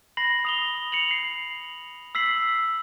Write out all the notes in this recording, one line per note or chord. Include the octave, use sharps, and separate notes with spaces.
B5 A#6 C7 F#7
D#6 F7 G7
C#7 F7 F#7
C7
E6 B6 C7 F#7